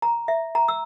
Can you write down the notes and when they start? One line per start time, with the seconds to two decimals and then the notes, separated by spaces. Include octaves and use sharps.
0.02 A#5
0.28 E5
0.55 A#5
0.68 E6